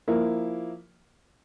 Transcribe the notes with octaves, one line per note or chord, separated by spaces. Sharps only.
F3 A#3 E4 A#4